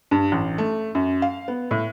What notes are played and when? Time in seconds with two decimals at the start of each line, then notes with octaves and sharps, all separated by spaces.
0.11 G2
0.32 A1
0.58 A3
0.95 F#2
1.22 F5
1.48 B3
1.71 A2